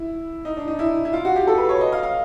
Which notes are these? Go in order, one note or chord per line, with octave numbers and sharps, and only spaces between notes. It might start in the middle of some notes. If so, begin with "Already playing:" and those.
Already playing: E4
D#4
D4
D#4
E4
E4
F4
F#4
G4
A4
B4
C#5
D#5
F5
F5